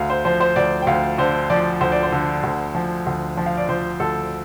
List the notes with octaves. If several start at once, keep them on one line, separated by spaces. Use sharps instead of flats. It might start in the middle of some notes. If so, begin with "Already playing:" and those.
Already playing: D2 F5
C5
F3 C5
C5
D2 D5
G5
D2 F5
D3 C5
F3 D5
D2 C5
D5
C5
D3
D2
F3
D2
F3
F5
D5
F3 C5
D2 A4